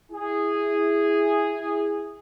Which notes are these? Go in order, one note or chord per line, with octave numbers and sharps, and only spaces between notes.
E4 G#4